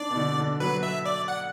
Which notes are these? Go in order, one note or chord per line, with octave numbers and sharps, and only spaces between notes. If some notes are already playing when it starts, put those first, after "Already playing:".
Already playing: D4 D5
B2
D3
D3
F#3 B4
E5
D5
F#5